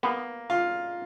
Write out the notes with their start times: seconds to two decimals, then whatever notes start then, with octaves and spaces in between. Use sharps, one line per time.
0.03 A#3 B3
0.50 F4